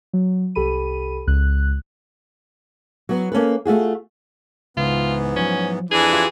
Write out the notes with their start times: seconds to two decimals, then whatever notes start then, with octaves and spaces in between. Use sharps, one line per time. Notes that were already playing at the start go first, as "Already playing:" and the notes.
0.13 F#3
0.55 C2 G4 A4 B5 D#7
1.27 C#2 F#6
3.09 F#3 B3
3.32 A#3 C#4 A4 B4
3.65 A3 F4 F#4 G#4
4.77 C#2 G#2 E3 B3 F4
5.36 F3 F#3 C#4
5.91 F2 E3 D4 G#4 G#5
6.13 E4 F4 G4